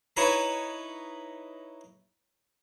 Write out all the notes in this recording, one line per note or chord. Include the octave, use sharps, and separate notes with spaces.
D#4 E4 B4 C#5 E5 A#5